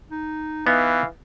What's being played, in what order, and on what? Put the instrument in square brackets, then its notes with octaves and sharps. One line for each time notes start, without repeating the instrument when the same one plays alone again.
[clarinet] D#4
[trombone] E3 [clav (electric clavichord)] B3 D#4 [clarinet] F5